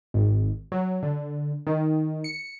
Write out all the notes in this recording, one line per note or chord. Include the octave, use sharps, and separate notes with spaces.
G#1
F#3
D3
D#3
C#7